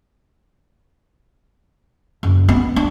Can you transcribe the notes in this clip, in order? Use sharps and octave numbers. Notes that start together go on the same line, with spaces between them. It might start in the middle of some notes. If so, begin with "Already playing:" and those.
F#1
B3
D4